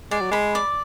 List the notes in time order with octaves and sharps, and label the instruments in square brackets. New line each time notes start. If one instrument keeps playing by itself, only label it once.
[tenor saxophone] G#3 [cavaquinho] D5
[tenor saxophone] F#3
[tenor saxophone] G#3 [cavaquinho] B5
[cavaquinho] D5